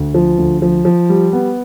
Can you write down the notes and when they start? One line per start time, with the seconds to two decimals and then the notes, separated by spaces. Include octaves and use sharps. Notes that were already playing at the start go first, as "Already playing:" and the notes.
Already playing: D2
0.14 F3
0.38 D2
0.62 F3
0.85 F3
1.09 G3
1.33 B3